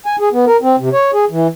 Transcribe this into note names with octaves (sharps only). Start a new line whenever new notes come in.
G#5
G#4
B3
A#4
C4
C3
C#5
G#4
E3